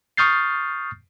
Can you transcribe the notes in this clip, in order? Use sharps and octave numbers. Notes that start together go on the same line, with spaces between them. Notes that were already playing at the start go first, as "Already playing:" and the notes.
C#6 D#6 F6 G6 A6 C7